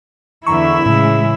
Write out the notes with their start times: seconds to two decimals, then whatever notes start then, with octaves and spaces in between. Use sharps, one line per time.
0.47 E2 D3 E3 E4 E5 A#5 C#6
0.86 A2 C#3 E3 G#3